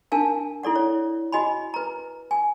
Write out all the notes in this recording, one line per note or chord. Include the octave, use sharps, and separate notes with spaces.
D4 A#4 F5 G#5 A5
E4 A4 D5 F#5
C#5
F#4 D#5 G#5 B5
B4 A#5
G#5